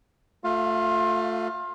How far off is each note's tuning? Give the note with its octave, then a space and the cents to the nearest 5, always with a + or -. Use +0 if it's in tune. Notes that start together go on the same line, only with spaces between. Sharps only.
A3 +15 F4 +30 F5 +0